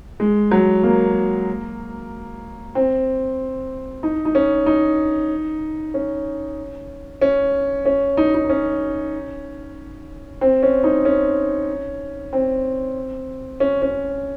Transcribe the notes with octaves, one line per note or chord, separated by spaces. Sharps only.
G#3
F#3
A#3
C4
D#4
D#4
C#4
D#4
C#4
C#4
C#4
D#4
D#4
C#4
C4
C#4
D#4
C#4
C4
C#4
C#4